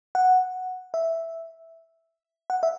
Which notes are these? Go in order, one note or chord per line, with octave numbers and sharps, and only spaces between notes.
F#5
E5
F#5
E5